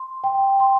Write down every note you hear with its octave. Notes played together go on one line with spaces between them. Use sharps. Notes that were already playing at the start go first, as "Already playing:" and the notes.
Already playing: C6
G5
C6